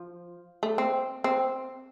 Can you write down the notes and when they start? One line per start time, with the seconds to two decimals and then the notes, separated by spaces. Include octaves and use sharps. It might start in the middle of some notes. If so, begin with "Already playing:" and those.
Already playing: F3
0.63 A3
0.78 C4
1.24 C4